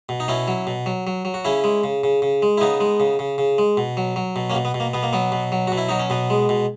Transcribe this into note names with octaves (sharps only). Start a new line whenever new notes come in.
B2
D#4
B2 C#4 E4
F#3
B2
F#3
F#3
F#3
F#4
C#3 C#4 E4
G#3
C#3
C#3
C#3
G#3
E4
C#3 B3 D#4
G#3
C#3
C#3
C#3
G#3
B2
F#3
F#3
B2
A#3 C#4
B2
B3
B2
A#3
B2 B3
A#3
F#3 B3
B2
F#3
B2 F#4
E4
F#3 D#4
C#4
B2 B3
G#3
B2